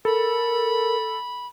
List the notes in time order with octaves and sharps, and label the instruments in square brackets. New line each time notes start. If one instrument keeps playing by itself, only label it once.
[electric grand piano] A4 [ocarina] A#4 [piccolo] B5